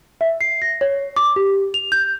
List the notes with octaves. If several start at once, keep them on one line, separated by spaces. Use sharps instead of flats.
E5
C7
A#6
C#5
D6
G4
F7
G6